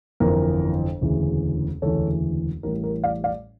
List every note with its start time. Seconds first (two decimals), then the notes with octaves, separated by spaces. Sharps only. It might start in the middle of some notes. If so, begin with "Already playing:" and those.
0.20 G1 F2 E3 A#4
1.01 E1 D2 C#3 E3
1.82 E1 D2 C#3 E3 A4 C#5
2.63 A1 A2 G3 A#4
2.84 A#4
3.04 D5 F5
3.24 D5 F5